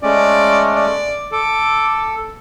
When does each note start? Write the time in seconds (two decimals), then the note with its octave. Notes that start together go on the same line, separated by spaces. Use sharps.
0.03 G#3 A3 C#4 D5
0.75 D5
1.32 A4 D6